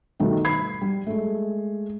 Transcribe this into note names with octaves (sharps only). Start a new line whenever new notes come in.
B2 D#3 G3 A3
B5 G#6 C7
G3
G#3 A3